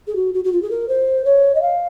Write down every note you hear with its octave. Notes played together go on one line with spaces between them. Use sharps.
G#4
F#4
F#4
F#4
F4
G#4
A#4
C5
C#5
D#5
F5